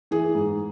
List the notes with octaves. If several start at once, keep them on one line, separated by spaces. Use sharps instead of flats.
E3 G#4
G#2